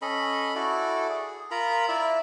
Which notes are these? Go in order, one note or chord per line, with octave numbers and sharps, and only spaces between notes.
C#4 A4 D#5 B5
E4 F#4 A4 D5
G#4
F4 A#4 A#5 B5
E4 D5 E5